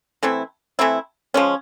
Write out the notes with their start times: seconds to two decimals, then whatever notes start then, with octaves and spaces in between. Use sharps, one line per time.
0.23 E3 A3 C4 E4
0.79 E3 A3 C4 E4
1.34 F3 G#3 C#4